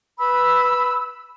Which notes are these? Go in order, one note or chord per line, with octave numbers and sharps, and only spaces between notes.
B4 B5 E6